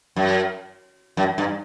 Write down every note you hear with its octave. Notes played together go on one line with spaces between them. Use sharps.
F#2
F#2
G2